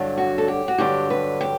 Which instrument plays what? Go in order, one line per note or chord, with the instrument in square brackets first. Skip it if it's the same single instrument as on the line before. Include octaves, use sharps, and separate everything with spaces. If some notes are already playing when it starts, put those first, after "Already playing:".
Already playing: [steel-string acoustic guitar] G2 D3 F#3
F#4
A4
G4
F#4
G2 D3 F#3 G4
B4
G4